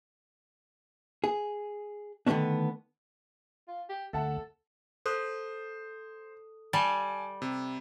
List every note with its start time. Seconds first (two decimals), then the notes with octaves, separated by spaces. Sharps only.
1.24 G#4
2.27 D3 D#3 A3 B3 C#4 D4
3.68 F4
3.89 G4
4.13 D2 A4 E5 F#5 A5
5.06 A4 C5 D#6 F#6
6.73 G3 G#5 A5 A6
7.42 C3